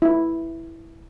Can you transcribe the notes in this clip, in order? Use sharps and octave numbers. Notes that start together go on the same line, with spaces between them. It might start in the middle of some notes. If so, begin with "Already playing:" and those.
E4